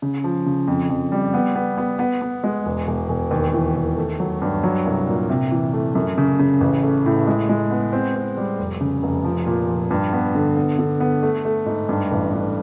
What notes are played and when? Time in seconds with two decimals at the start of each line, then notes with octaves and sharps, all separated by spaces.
0.02 C#3
0.24 F3
0.46 C#3
0.68 F2
0.90 F2
1.12 G3
1.34 B3
1.56 B3
1.78 B3
1.99 B3
2.21 B3
2.44 G#3
2.66 E1
2.87 E1
3.09 E1
3.31 D#2
3.54 E3
3.76 D#2
3.97 A3
4.20 F#3
4.42 G2
4.63 F#3
4.86 C2
5.08 A#2
5.29 C3
5.51 E3
5.73 A3
5.95 F#2
6.18 C#3
6.39 C#3
6.61 A1
6.83 A3
7.06 A2
7.27 G#3
7.49 G#3
7.71 B3
7.93 C4
8.15 C4
8.37 G3
8.59 F1
8.81 C#3
9.03 F1
9.24 F3
9.47 A#2
9.69 F3
9.91 G2
10.13 B3
10.35 D3
10.57 B3
10.79 D3
11.00 B3
11.23 A3
11.45 A3
11.66 G#2
11.89 G2
12.11 A1
12.33 G2